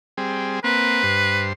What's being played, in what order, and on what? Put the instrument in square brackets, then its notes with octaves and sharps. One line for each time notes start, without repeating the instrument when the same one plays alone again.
[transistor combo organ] G3 C4 G#4
[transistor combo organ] A#3 C4 [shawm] B4
[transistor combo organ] G2 C5